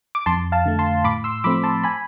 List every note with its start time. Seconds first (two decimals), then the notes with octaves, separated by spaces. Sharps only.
0.15 D6
0.26 F2 A5 C6
0.52 F5 A5
0.66 D3 A3
0.79 A5 C6
1.04 A2 B5 D6
1.24 C6 E6
1.44 F3 A3 C4 B5 D6
1.64 A5 C6
1.84 G#5 B5